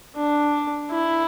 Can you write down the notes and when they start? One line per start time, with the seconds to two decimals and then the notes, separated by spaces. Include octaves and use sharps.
0.15 D4
0.91 E4